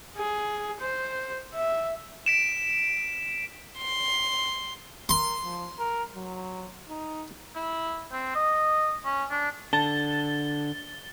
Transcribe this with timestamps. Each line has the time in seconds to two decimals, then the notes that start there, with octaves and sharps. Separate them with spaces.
0.16 G#4
0.80 C5
1.55 E5
2.26 B6 D7 E7
3.78 C6
5.09 A#4 C6
5.43 F3
5.79 A#4
6.16 F#3
6.89 D#4
7.55 E4
8.12 C4
8.35 D#5
9.05 C#4
9.30 D4
9.73 D3 A5 A6 G7